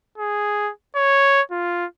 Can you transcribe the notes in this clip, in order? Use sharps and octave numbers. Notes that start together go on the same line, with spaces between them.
G#4
C#5
F4